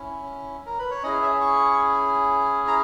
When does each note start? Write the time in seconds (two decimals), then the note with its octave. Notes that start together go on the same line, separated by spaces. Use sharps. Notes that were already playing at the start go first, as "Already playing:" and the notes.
Already playing: C#4 E4
0.66 A#4
0.79 B4
0.91 C#5
1.03 C#4 E4 G#4 D#5
1.22 E5
1.41 C#6
2.67 A#5